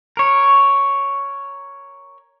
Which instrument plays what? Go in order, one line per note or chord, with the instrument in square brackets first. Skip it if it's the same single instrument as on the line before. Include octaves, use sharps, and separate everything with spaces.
[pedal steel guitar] A#4 C#5